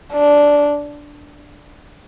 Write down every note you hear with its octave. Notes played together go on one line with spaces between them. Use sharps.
D4